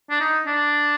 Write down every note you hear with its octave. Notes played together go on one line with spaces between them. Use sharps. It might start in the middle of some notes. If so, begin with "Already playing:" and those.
D4
D#4
D4